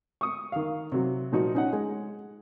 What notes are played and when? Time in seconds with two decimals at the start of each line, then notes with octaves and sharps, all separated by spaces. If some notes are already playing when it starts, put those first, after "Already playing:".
0.21 C#6 D#6
0.52 D#3 F5
0.92 C3 F#3
1.32 A#2 F3 D#4 F#4
1.55 C#4 D#4 F#5
1.73 G#3